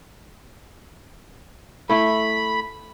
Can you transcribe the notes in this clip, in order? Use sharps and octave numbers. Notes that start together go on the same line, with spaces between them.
A3 E4 B5